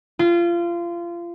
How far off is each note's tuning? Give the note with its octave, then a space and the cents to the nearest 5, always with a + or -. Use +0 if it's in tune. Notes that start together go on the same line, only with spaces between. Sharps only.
F4 -25